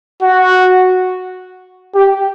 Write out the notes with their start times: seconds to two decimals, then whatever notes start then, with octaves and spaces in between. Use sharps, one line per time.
0.23 F#4
1.95 G4